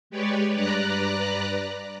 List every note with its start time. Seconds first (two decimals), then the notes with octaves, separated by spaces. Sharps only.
0.10 G#3 G4 B4 C#5 D5
0.55 G2 B4 D5 A#5 F#6